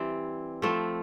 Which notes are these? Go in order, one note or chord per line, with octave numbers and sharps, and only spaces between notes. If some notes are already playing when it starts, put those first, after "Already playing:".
Already playing: E3 G3 C4
F3 A3 C4